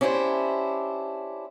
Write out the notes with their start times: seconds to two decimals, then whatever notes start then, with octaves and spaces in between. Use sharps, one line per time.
0.01 C#4 D4 E4 G4 B4 C5